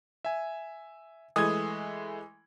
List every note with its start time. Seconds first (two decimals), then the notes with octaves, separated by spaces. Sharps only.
0.25 E5 G#5
1.36 E3 G#3 A3 D#6 G#6